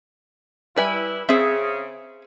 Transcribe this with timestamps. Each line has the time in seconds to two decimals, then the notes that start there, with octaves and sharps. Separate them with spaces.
0.76 G3 E4 B4 G#5
1.29 C#3 C4 G#4 E5